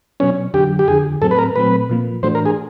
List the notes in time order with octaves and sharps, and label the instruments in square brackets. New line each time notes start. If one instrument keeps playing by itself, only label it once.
[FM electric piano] B2 F#3 B3 [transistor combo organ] C#4
[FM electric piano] F2 D3 F#3 [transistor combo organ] G4
[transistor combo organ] G4
[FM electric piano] F2 D3 F3 [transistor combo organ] G#4
[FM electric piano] A2 F#3 A3 C4 [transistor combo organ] A4
[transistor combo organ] B4
A#4
[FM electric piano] A#2 F#3 A3 C4 [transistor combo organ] B4
[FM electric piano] A#2 F3 A#3
[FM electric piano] A2 E3 A3 D4 F#4 [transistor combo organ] C5
[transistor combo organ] A#4
G#4